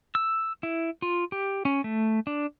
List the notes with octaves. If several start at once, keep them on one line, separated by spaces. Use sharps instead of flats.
E6
E4
F4
G4
C#4
A3
D4